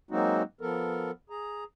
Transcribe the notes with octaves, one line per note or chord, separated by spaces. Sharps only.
F#3 G#3 A#3 C4 D#4 F#4
F3 B3 A4 A#4
G#4 A#5